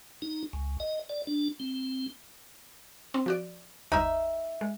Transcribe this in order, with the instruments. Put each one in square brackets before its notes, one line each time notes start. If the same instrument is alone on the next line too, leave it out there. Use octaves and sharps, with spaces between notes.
[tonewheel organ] D#4
C#2
D#5
D5
D4
C4
[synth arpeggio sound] C4
F3 F#4 D5
[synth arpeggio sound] G1 D#2 [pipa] D#4 E5
[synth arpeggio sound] G#3